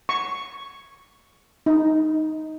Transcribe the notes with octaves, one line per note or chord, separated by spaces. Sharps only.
C#6
D#4